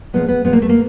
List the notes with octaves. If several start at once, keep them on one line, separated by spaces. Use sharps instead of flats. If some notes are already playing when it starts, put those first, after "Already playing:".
A#2 F3 G#3 B3
B3
A#2 F3 G#3 B3
A#3
A3
A#3